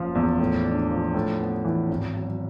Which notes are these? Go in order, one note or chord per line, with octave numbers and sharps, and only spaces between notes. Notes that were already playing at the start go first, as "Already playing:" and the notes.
Already playing: F#1 F3
E2
A2
D4
F3
A2
B3
E3
G#1
F#3